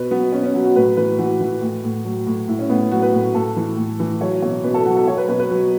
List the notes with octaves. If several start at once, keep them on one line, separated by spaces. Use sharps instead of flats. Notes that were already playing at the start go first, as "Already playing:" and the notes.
Already playing: B2 B4
F#3 B3
B2 C#4
C#4
F#3 F#4
F#4
A2 B4
E3 B4
E3 F#4
E3
A2
A2
F#3
A2
A2 E4
C#4
A2 B3
F#3 F#4
B4
A2
F#4
A2 A4
E3
A2
E3
F#3 C#5
B2 C#5
B2 B4
A4
F#3 F#4
A4
F#3 C#5
B4
B2 B4
B4
F#3